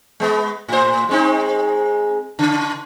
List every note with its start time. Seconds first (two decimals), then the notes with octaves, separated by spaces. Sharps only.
0.20 G#3 B3
0.68 A2 C5
1.09 G#3 C4 D#4
2.39 C#3